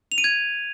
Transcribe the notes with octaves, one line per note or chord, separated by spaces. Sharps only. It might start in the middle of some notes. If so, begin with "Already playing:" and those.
F7
D#7
G#6